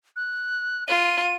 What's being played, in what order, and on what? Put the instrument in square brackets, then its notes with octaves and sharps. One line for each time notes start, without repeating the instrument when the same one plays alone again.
[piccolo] F#6
[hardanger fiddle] F4 [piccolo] D#7